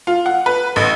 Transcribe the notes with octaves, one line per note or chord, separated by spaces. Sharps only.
F4
F#5
B4
A1